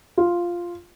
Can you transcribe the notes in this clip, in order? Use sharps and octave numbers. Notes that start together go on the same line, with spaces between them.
F4